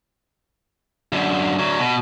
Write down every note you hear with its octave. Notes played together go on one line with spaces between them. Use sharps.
F#2 D3
D2 F#3
B2